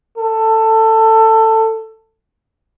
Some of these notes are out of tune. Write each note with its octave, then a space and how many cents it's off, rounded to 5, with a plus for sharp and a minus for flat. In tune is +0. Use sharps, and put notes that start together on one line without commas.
A4 +15